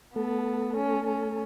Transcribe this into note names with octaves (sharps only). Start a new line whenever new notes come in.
A3 B3 A4
C#4
C#4